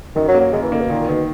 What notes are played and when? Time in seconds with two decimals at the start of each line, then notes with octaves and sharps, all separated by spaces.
0.16 F#2 D#3
0.28 F#3
0.34 A#3
0.41 F#3
0.53 F#2 G#3
0.63 E3
0.72 D#3 A#3
0.81 B2
0.90 A#2 D#3
1.09 B2 D#3